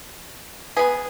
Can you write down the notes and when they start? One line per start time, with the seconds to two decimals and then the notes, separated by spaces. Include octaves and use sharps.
0.77 B3 G#4 B4